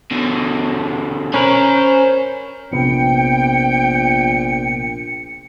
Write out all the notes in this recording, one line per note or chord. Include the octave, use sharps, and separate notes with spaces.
B2 D3
C#4 A#4 C5 B5
A#1 C3 B3 G5 C#7